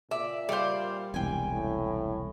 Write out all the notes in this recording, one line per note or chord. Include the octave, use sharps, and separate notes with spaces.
A#2 D5 E5
G3 C5 D5 F5
E1 C2 G5 G#5
A2